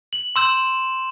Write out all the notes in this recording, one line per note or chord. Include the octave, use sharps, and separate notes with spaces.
F#7
C6 E6 G6 E7